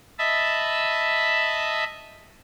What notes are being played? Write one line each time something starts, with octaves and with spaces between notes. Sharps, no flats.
D#5 E5 A5 B5